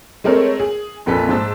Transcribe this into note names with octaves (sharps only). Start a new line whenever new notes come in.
G#3 A3 C4 A#4 C#5
G#4
A#1 F2 A#2 A4 B4 B6
G#2 C5 A5 E6